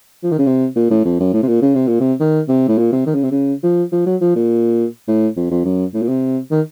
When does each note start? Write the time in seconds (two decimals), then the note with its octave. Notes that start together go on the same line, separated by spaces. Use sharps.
0.23 F3
0.31 D#3
0.38 C#3
0.47 C3
0.76 A#2
0.90 A2
1.04 F2
1.19 F#2
1.33 A2
1.43 C3
1.48 A#2
1.62 C#3
1.75 C3
1.87 A#2
2.00 C3
2.20 D#3
2.48 C3
2.68 A2
2.78 A#2
2.92 C3
3.06 D#3
3.14 C#3
3.23 C3
3.31 C#3
3.63 F3
3.92 F3
4.06 F#3
4.21 F3
4.35 A#2
5.08 A2
5.36 F2
5.50 F2
5.65 F#2
5.94 A2
6.02 A#2
6.08 C3
6.51 D#3